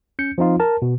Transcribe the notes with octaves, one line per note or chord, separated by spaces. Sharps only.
C#4 G6 C#7
F3 C4 D#4 F4
A#4 A5
B2